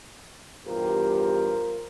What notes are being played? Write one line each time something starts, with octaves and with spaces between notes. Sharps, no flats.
E2 G2 F4 G4 A#4 C5